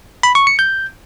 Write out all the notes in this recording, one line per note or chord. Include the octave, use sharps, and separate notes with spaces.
B5
C#6
C#7
G6